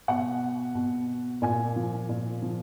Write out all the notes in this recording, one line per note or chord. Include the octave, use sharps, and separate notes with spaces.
B2 F#5
B2
A#2 G#5
F3
A#2
F3